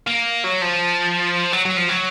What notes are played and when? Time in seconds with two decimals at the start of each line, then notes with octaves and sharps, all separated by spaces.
0.07 A#3
0.44 F#3
0.62 F3
1.53 F#3
1.65 F#3
1.77 F3
1.89 F#3